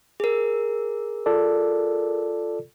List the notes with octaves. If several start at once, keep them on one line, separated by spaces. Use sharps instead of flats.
G#4 A#4
F4 A4 D5